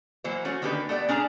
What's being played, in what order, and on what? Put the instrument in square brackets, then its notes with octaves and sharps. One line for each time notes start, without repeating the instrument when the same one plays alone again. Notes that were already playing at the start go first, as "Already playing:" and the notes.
[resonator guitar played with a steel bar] E3 F#3 A#3 E4 C5
A3 C#4 F#4
D3 D#3 A#3 D4 G4 B4
A3 B3 D5
C#4 D4 G#4 A#5